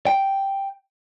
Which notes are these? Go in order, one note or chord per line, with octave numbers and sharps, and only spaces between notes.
G5